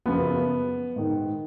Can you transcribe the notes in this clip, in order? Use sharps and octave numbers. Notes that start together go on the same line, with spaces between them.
F#2 C#3 F3 B3
G#2 D#3